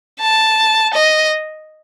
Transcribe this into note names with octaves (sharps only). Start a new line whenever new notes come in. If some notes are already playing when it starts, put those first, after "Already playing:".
A5
D#5